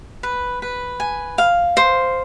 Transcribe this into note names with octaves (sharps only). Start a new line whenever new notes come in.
B4
B4
G#5
F5
C5